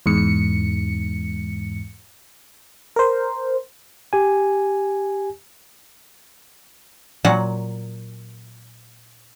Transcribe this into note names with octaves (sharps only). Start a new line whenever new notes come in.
E2 G#2 C#7
A#4 C5
G4 G#5
A#2 F#3 F#5